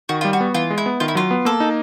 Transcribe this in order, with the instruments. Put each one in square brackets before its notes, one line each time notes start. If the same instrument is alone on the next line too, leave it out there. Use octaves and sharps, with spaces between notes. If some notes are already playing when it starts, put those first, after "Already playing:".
[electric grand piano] D#3 [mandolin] F#4
[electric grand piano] G3 [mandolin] F4
[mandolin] F#4
[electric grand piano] B3
[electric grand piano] E3 [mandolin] F4
[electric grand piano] G#3
[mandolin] E4
[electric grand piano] B3
[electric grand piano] D#3 [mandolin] F4
[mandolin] E4
[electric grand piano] F#3 [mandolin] F4
[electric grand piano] B3
[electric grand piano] A#3 [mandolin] A4
[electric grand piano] D#4